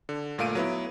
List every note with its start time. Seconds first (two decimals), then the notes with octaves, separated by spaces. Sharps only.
0.09 D3
0.38 G1 A#2 A3 F5 D7 D#7
0.55 F#3 B3 E4